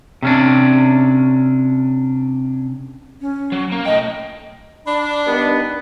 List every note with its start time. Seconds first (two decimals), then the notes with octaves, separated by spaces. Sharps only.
0.23 C3 C#4 D4
3.21 C#4
3.52 F#3
3.72 A#3
3.86 A3 D#5 G5
4.86 D4 B5
5.27 G2 D#3 B3